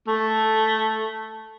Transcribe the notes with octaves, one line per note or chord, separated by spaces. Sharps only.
A3